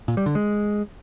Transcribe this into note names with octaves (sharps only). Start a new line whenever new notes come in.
A#2
G3
D3
G#3